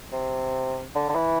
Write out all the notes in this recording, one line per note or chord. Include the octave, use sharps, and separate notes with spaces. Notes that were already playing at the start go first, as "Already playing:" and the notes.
C3
D3
D3
E3